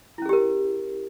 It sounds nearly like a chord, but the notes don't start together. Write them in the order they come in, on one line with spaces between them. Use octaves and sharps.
E4 C#4 G#4 G4 A#4